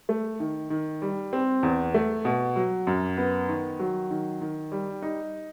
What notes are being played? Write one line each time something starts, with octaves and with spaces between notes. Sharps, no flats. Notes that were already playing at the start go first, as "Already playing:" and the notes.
A3
D#3
D#3
G3
C4
E2
A3
B2
F#3
F#2
B3
D#3
F#3
D#3
D#3
G3
D#4